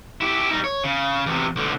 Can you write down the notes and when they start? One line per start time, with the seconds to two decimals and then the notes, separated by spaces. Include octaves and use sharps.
0.21 E4 G4
0.51 G3 D#4
0.64 C#5
0.84 C#3
1.26 E2 C3
1.56 B1 D3